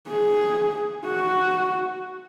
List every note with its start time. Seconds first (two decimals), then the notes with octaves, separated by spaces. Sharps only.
0.08 G#4
1.06 F#4